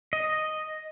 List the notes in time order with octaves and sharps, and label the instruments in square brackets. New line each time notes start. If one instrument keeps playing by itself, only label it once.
[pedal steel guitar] D#5